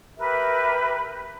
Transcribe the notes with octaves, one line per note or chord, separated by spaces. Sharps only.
G4 A#4 B4 E5